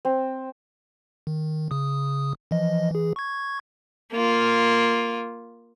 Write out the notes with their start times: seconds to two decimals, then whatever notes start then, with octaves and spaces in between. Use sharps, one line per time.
0.05 C4
1.27 D#3
1.71 C#3 D#6
2.51 E3 F3 D#5
2.90 E3 G#4
3.16 C#6 G#6
4.13 A#3 F4